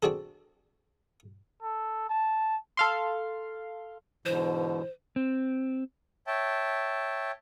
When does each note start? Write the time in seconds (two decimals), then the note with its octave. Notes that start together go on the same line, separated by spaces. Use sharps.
0.03 C4 D4 F#4 G#4 A4
1.62 A4
2.09 A5
2.77 A4 F5 C6
4.26 G#2 B2 D3 E3 C5
5.16 C4
6.27 C#5 E5 G5 A5